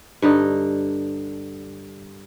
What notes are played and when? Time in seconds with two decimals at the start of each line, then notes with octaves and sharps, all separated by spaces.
0.22 G2 D3 D#4